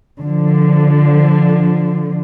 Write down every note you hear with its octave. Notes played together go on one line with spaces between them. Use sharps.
D3 F3